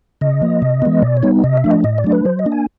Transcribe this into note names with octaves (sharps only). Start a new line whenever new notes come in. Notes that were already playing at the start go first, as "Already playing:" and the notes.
C#3 D#5
F3 A#3
C3
E3 G#3 B3
B2 D5
C#5
G3 B3 D#4
C3 D#5
E5
F3 A3 D4
D#5
A2 D#5
D5
F#3 A3 D4
B4
F#3 C5
D#5
A#3 D4
G#5